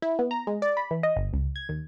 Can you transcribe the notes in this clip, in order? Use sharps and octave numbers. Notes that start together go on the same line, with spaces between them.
E4
B3
A#5
G#3
D5
B5
E3
D#5
G1
C#2
G#6
D#2